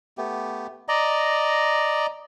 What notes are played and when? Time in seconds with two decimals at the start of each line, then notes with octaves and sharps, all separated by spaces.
0.18 A3 B3 G4
0.88 D5 D#5 A#5